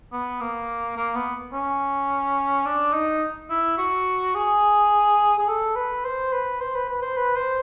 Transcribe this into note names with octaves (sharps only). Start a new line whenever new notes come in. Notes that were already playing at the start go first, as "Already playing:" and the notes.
B3
A#3
A#3
B3
C#4
D4
D#4
E4
F#4
G#4
G#4
A4
B4
C5
B4
C5
B4
B4
C5
B4
C5